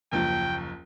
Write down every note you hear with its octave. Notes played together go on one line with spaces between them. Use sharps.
F#1 D#2 F3 G5